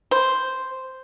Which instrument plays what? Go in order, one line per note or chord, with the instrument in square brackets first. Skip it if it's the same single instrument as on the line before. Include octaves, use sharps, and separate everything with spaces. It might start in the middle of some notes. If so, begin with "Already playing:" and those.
[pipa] C5